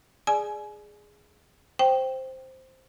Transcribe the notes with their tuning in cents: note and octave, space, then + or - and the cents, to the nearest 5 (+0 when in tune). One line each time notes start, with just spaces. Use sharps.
G#4 +0 D5 +15 G#5 +30
C5 +0 G5 +0